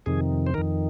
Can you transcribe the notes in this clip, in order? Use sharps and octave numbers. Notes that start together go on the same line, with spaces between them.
F2 C3 D#3 G#4
C5
F2 D#3 A#4